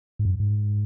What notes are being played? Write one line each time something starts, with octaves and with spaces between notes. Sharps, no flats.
G#2
F#2
G#2